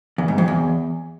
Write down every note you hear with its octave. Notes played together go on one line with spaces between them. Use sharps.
E2
G#2
F2
E2